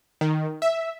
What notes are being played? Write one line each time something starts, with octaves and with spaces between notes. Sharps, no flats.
D#3
E5